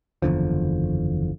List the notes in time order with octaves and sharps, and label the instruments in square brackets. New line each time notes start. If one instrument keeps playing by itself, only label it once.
[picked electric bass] F#1 E2 D3 F3